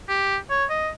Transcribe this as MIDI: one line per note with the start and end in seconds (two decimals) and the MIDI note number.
0.09 0.37 67
0.50 0.65 73
0.70 0.90 75